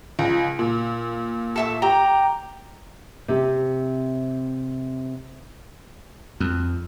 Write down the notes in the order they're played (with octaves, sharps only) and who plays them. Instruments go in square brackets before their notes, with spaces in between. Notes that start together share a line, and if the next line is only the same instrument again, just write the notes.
[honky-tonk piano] C#2 [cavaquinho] A#5
[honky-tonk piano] A#2
[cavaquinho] A4 E5 C#6
[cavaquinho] G4 [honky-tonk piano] A#5
[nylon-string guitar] C3 C4 G4
[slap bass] F2